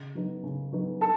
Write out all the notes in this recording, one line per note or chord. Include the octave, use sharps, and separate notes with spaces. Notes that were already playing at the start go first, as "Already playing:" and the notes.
Already playing: C#3
F#3 B3 D#4
C#3
F#3 B3 D#4
A4 A5